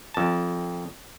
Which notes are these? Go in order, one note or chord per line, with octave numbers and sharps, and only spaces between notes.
F2 A5